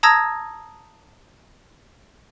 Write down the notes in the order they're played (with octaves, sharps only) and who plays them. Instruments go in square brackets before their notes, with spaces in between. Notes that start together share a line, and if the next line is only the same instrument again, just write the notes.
[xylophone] A5 A#5 D#6 E6 G#6 A#6